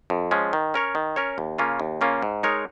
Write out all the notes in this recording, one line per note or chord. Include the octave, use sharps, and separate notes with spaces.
F2
F3 G#3 C#4
D#3
C#4 A#4 C#5
D#3
C#4 A#4 C#5
D#2
C#3 A#3 C#4 F4
D#2
C#3 A#3 C#4 F4
G#2
G#3 D#4 A#4 C#5